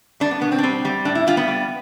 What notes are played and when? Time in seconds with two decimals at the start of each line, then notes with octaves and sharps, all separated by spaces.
0.20 G3 D4
0.31 B3
0.41 B2 B3
0.52 C4
0.58 D4
0.63 G3 C4
0.85 G3
1.05 A2 D4
1.15 E4
1.27 G3 F4
1.37 B3
1.48 G3